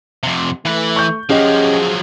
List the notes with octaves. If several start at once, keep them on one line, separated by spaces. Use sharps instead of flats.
F2 C3
E3 A3 B4
C#6 G6
F3 F#3 C#4 G4 G#4 D#5